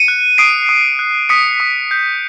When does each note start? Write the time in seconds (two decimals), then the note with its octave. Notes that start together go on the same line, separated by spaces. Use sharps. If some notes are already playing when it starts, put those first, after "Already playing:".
Already playing: C#7 D#7
0.08 F#6
0.38 D#6 C7 D7
0.69 D#6
0.99 F#6
1.29 D#6 B6 C#7
1.60 D#6
1.91 G6